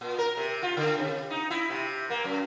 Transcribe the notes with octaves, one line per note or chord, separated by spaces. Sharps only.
A#2
A#4
C3
F4
D3
C3
D#4
E4
C3
A#3
F#2